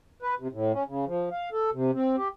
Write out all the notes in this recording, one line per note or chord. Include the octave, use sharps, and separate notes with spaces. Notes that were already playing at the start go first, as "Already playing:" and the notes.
B4
C3
A2
C#4
C#3
F3
F5
A4
C3
C4
G4